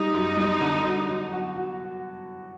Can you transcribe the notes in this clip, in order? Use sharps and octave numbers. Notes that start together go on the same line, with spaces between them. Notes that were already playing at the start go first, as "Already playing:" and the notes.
Already playing: G3 D#4
F#2
G3
D3
F#3
F#3
F#4
F#4